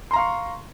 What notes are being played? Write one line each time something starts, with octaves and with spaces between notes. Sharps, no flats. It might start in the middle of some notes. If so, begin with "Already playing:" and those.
F5 A#5 C6 C#6